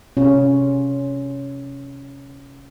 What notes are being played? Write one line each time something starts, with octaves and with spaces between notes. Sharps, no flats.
C3 C#4 F4